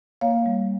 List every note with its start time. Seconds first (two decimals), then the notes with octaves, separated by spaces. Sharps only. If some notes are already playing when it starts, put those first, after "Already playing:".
0.21 A#3 C#5 F5
0.46 G3